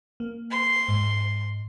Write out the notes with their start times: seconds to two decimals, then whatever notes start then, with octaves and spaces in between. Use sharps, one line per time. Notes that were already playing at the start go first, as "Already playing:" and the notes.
0.20 A#3
0.51 C6
0.88 G#2